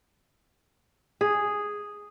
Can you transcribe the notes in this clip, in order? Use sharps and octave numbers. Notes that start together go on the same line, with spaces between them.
G#4